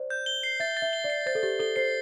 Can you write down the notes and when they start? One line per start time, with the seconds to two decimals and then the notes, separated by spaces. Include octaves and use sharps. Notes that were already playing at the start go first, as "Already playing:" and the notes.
Already playing: C5 D5
0.10 G6
0.26 G7
0.43 C7
0.60 E5 A6
0.77 A6
0.82 E5
0.93 G7
1.04 D5
1.10 C7
1.26 C5 A6
1.35 A4
1.43 G4 A6
1.59 A4 G7
1.76 C5 C7